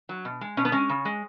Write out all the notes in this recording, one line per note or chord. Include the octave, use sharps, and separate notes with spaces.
F#3
B2
G#3
B2 C#4
B3
G#3 C#4
C#3
G#3